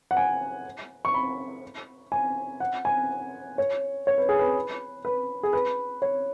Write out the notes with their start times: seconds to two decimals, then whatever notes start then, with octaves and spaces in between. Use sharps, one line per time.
0.11 F#5
0.17 G#5
1.05 C#6
1.14 B5
2.12 G#5
2.60 F#5
2.85 G#5
3.58 C#5
4.07 C#5
4.18 B4
4.29 G#4
4.39 B4
5.05 B4
5.43 G#4
5.53 B4
6.02 C#5